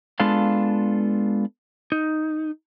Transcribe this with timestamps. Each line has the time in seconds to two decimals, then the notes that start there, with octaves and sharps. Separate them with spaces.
0.20 G#3 B3 D4 F4 A4 F5
1.92 D#4